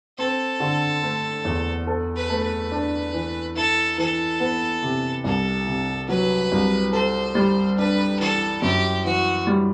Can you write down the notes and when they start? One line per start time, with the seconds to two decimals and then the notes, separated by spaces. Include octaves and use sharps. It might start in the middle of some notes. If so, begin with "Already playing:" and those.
0.18 C4 A4
0.60 D3
1.03 A3
1.45 E2
1.87 A4
2.16 B4
2.30 A3
2.44 B4
2.72 D4
3.14 E3
3.55 E4 A4
3.98 E3 A4
4.40 B3
4.83 C3
5.24 C2 A4
5.67 C3
6.09 F#3 B4
6.52 C2
6.93 A4 C5
7.35 G3
7.78 D4 B4
8.20 E3 A4
8.62 F#2 G4
9.05 E3 F#4
9.47 G3